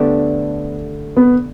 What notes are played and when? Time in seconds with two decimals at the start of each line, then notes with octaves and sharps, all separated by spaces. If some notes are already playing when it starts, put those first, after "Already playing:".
Already playing: D3 A3 B3 D4 G4
1.17 B3